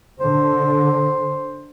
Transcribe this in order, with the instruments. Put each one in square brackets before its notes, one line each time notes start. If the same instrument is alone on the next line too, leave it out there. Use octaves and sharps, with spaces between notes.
[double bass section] D3 [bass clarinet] C5